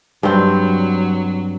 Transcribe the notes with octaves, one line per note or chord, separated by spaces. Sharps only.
G2 F#3 C4